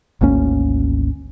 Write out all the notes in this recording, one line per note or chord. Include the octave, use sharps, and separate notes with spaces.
G#1 D2 A#3 C#4